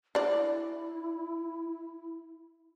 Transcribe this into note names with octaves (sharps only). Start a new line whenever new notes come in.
D4 E4 D5